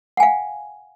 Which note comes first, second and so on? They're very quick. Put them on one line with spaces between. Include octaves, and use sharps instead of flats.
F#5 G#5 F5